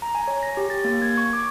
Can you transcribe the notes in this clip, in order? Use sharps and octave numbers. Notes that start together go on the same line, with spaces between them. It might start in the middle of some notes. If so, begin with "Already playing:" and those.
A#5
G#5
C#5
A#6
G4
A6
A#3
G#6
C#6
D6